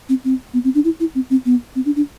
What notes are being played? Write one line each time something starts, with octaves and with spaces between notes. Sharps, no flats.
C4
C4
B3
C4
D4
E4
E4
C4
C4
B3
C4
D4
D4